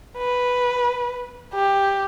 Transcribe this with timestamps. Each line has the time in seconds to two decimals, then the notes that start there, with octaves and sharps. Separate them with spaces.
0.17 B4
1.54 G4